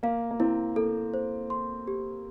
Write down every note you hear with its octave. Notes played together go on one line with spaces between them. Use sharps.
A#3 F5
A#3
C4 E4
A#3 A4
C5
C6
G4